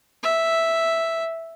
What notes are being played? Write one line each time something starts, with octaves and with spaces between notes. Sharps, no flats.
E5